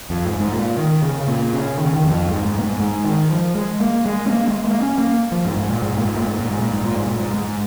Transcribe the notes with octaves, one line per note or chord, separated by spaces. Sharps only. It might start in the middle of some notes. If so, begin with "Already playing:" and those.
F2
G#2
G#2
A#2
D#3
C#3
C#3
A#2
C#3
D#3
C#3
D#3
F2
G#2
G#2
A#2
G#2
G#2
D#3
F3
G#3
A#3
G#3
C#4
A#3
G#3
A#3
C#4
A#3
F3
G#2
G#2
A#2
G#2
A#2
G#2
A#2
G#2
A#2
G#2
A#2
G#2
A#2
G#2
A#2
G#2
G#2